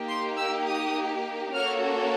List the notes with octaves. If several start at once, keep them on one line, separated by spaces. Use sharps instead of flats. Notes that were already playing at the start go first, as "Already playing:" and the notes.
Already playing: A#3 D#4 G4
C6
E6
D#6
A#3 C#4 F#4 A4 F6